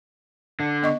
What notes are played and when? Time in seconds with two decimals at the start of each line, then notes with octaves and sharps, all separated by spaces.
0.60 D3
0.83 B3 D#5 C#6